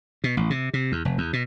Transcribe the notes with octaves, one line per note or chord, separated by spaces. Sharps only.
B2
A1
C3
C3
E2
F1
E2
B2